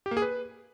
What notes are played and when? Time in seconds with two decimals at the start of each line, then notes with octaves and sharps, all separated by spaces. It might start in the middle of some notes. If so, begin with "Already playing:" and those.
0.06 G4
0.11 A#3
0.17 G#4
0.22 B4